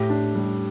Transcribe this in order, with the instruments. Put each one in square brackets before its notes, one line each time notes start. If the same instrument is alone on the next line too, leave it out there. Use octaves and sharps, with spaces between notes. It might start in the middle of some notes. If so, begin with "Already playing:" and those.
Already playing: [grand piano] A2 G4
D4
G3